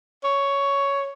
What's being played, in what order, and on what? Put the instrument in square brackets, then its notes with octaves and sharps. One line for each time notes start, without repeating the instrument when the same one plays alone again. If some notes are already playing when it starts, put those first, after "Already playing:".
[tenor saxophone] C#5